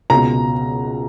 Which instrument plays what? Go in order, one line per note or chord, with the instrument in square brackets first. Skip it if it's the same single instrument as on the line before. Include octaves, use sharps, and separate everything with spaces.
[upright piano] C#2 B2 A#5